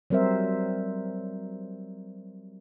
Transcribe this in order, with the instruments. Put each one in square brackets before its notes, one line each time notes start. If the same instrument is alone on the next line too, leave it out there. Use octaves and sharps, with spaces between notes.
[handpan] F#3 G3 C4 A#4 C5 E5